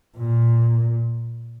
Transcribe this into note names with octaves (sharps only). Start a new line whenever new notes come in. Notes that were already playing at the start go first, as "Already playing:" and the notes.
A#2